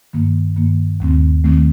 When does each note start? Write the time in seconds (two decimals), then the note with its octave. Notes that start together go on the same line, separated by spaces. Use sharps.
0.13 G2 D#3 A#3
0.57 G2 D#3 A#3
1.00 D#2 D#3 A3 C4
1.44 D#2 D#3 A3 C4